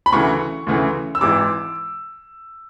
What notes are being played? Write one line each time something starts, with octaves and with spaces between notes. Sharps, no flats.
B5
D2 C#3 E3 C#6
D2 C#3 E3
E6
G#1 G#2 E3 D6